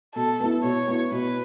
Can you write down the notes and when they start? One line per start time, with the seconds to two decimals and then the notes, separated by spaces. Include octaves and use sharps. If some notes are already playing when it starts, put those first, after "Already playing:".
0.15 B2 A4
0.40 B3 E4
0.63 B2 C#5
0.88 B3 E4
1.12 B2 B4